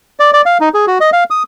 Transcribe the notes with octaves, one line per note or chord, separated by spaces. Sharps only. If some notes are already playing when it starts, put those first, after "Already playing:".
D5
D5
F5
D#4
G#4
F#4
D#5
F5
D#6